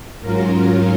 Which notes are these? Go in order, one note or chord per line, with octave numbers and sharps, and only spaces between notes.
G#2 F#3 C#4 F4 A#4